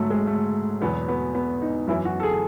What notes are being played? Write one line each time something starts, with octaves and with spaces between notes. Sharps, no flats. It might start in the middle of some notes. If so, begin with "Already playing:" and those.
Already playing: G#2 F#3 A3
G#3
A3
E2 B2 F#3 B3
B3
B3
D#4
F#2 E3 E4
F#4
A4
G#4